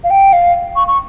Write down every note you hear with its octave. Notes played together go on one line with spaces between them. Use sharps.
F5
G5
F5
C#6
C#6